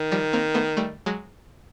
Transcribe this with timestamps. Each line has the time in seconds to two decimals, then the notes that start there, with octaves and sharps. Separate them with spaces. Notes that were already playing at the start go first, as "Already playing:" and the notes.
Already playing: D#3
0.12 F3 G3
0.33 A#3 C4
0.54 A3 B3
0.77 G3 A3
1.06 F#3 G#3